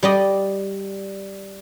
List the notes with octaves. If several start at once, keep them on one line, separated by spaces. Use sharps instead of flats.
G3 D5 D#5